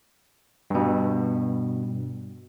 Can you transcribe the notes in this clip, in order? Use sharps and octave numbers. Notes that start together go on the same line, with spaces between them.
G2 B2